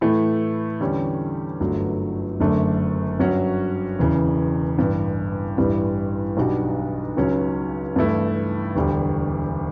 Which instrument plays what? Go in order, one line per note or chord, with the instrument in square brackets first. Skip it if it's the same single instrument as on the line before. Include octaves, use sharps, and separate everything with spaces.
[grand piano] A2 E3 A3 E4
E2 D3 G3 C#4
G1 F#2 D3 F#3 A3
F#1 F#2 D3 A3 D4
G2 F#3 C#4 F#4
E1 E2 C#3 E3
A1 G2 E3
A1 G2 E3 G3
B1 B2 G3 D4 F#4
C#2 C#3 F#3 C#4
G2 E3 A3 E4
E1 D2 D3 G3